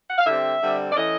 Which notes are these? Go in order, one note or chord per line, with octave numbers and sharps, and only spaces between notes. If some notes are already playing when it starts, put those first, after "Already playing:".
F#5
F5
D3 G3 C4 E5
D3 G3 C4
D5
E3 A3 C#4 D#5